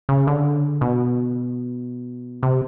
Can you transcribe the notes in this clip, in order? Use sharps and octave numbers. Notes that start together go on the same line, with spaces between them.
C#3
D3
B2
C3